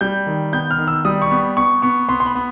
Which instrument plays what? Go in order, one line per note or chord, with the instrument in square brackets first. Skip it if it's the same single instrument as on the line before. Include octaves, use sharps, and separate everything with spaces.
[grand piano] G3 G6
D#3
B3 G6
F6
D#3
E6
G3 D#6
C#6
B3
B3 C#6
B3 C#6
B3 C6
C6
B5
B3